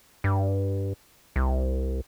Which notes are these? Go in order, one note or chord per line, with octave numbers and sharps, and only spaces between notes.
G2
C2